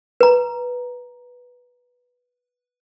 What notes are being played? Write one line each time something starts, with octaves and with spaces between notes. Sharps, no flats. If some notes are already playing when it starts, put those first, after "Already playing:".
B4 A#5